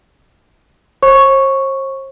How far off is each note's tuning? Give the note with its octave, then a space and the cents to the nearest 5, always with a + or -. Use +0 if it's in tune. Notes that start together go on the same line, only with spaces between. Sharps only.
C5 +45 C#6 +0